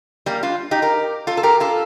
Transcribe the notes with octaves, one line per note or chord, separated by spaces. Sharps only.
G3 A#3
D4 F4
D#4 G4
G4 A#4
F4 A4
A4
G4 A#4
F4 A4